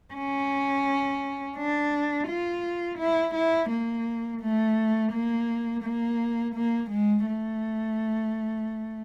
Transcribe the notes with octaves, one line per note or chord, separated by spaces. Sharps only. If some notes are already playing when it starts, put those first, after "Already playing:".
C#4
D4
F4
E4
E4
A#3
A3
A#3
A#3
A#3
G#3
A3